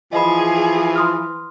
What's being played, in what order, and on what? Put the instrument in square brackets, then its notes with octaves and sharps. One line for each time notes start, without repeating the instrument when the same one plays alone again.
[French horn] E3 [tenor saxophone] F3 [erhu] G#4 [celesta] D#5 B5
[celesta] C6 D#6 F6